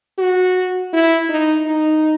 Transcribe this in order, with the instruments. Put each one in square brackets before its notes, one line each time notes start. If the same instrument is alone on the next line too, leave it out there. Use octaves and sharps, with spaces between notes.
[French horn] F#4
E4
D#4
D#4